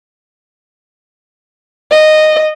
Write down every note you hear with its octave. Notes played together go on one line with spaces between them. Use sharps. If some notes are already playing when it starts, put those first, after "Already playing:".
D#5